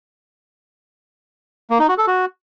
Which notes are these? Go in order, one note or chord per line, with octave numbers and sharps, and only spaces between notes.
A#3
D#4
F#4
A4
F#4